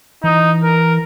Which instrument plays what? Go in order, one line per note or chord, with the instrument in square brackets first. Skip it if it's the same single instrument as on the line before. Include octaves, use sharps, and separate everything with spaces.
[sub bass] E3 [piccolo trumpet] D#4
[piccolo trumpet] A#4